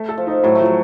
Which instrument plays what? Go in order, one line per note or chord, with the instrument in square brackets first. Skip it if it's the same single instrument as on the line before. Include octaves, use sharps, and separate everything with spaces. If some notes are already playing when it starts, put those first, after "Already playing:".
Already playing: [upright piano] A3
A4
[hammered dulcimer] F3
[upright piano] D#4
[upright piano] A2 [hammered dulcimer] F#3
[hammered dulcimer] A3
[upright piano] F3
[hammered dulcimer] F#3